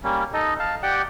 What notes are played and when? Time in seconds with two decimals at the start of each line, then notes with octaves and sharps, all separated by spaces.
0.04 G3 A#3 C#4
0.34 D#4 A4 D#5
0.59 F5 A5
0.83 G4 D5 F#5 G5